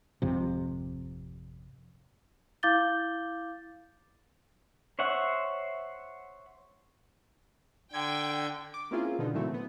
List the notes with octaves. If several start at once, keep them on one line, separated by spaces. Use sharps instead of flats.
G#1 F2 C3
E4 F5 D6 G6 A6 G7
C5 C#5 E5 F#5
D3 G5 G#6
D6
A#3 C4 C#4 E4 F4 G#4
B2 D3 B3 D#4
A#2 C#3 E3 F#3 A3 C4
B3